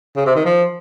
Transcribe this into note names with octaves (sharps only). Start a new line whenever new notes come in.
C#3
C3
D#3
F3